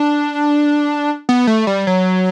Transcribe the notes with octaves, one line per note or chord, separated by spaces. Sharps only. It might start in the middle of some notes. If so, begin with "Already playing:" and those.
Already playing: D4
B3
A3
G3
F#3